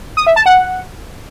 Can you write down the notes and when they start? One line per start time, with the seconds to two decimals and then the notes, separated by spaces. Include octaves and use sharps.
0.17 D#6
0.27 E5
0.36 A5
0.46 F#5